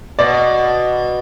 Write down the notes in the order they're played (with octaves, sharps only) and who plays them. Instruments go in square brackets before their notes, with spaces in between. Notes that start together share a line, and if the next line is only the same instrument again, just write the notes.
[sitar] B2 [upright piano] D5